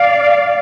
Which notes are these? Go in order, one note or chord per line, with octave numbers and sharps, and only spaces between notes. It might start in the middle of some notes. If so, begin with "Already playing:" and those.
Already playing: D5 F5